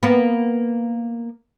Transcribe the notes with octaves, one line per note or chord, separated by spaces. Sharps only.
A#3 B3